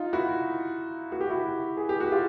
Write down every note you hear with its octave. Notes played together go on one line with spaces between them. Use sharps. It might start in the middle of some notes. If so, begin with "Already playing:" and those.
Already playing: D#4 F4
E4 F#4
F#4
G4
E4 F#4
G#4
G4
F#4
F4 G4